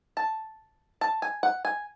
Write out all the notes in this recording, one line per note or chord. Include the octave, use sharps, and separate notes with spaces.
A5
A5
G#5
F#5
G#5